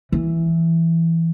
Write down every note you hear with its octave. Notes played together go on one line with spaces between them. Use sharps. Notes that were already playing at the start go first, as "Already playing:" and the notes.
E3